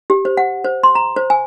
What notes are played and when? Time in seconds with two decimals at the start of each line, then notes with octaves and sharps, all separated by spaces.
0.10 G4
0.25 C5
0.37 F#5
0.64 C5
0.83 C6
0.95 A#5
1.16 C5
1.30 G#5